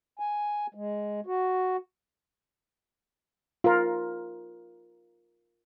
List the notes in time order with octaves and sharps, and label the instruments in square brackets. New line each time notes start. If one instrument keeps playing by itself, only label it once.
[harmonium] G#5
G#3
F#4
[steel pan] F4 A#4